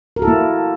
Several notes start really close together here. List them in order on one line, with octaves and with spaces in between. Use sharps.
A#4 F#4 A4 E4 A#3